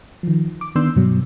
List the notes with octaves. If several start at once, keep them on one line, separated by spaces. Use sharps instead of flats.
D#3 F3
D6
D#3 B3 D4 C6 E6 G6
G2 B2 F#3